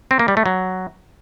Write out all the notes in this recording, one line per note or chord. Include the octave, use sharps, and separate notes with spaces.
C4
A#3
G3
A3
F#3